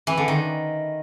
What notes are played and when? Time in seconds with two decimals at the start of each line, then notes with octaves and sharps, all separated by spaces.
0.07 E3
0.17 D3
0.28 D#3